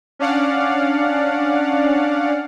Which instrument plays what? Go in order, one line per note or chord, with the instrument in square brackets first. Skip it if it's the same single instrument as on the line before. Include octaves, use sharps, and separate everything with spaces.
[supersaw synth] C#4 D4 D5 F5 F#5